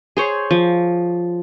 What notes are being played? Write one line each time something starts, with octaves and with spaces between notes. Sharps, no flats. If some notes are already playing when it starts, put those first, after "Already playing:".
G#4 C5 C#5
F3